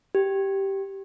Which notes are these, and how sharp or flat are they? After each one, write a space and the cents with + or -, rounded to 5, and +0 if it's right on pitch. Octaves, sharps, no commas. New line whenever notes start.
G4 -10